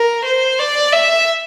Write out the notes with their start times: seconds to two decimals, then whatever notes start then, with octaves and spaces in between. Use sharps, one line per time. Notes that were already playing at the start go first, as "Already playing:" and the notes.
Already playing: A#4
0.25 C5
0.59 D5
0.92 E5